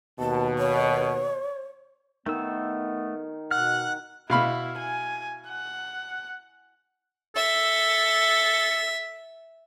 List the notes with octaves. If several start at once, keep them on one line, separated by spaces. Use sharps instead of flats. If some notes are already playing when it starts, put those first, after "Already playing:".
D#2 B2 A5
C#5
D#3 A3 B3 E6
B2 F#5 F6 F#6
B2 E4 F5 B5
G#5
F#5
A4 E5